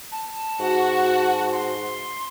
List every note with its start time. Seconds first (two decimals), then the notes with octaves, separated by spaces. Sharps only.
0.12 A5
0.59 G#2 F#4
1.52 C6